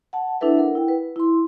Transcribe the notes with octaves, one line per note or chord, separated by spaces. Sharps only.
F#5 A5
D4 E4 A4 B4 E5
A#4 F#5
E4 G5
B4
E4 C6